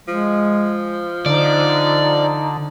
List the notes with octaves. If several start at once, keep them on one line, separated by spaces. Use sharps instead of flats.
F3 G#3
D3 D#4 D5